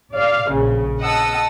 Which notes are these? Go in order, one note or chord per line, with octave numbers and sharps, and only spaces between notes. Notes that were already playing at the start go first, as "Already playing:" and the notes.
D5 F5
A#1 C#3
D#5 F#5 A5 D#6 E6